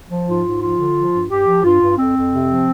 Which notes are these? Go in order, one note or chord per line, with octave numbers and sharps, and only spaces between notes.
F3
G#2 F4
G#2
F3 F4
D3
F3
G2
G2 G4
F3
G2 F4
G2
F2 C4
F2
C3
F3